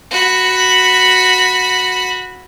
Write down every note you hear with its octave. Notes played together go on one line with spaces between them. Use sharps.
F#4 B5